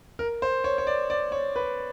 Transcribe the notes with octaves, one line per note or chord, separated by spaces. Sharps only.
A#4
C5
C#5
C#5
D5
D5
C#5
B4